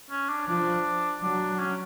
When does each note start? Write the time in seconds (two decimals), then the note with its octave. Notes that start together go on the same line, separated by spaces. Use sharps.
0.11 C#4
0.29 D4
0.48 F3 D4
1.22 F#3 D4
1.59 C#4